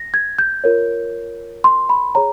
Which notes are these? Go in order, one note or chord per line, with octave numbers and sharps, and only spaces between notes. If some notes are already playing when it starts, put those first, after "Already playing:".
Already playing: A#6
G#6
G6
F4 A#4 C#5
C6
B5
G#4 C#5 A#5